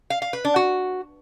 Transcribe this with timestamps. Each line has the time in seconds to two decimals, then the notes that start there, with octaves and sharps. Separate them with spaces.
0.10 F5
0.22 F5
0.33 B4
0.45 D4
0.56 F#4